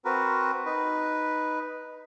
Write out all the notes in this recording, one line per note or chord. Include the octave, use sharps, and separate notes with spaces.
C4 F#4 A#4 B4
D#4 B4